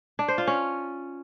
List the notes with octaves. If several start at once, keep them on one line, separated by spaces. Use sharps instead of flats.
D4
C5
F4
C#4